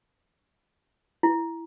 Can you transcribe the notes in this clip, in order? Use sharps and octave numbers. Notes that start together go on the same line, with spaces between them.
E4